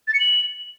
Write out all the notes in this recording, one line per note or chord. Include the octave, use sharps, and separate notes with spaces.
A6
C#7
F#7